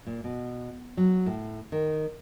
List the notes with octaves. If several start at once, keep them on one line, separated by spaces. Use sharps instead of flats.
A#2
B2
F#3
A2
D#3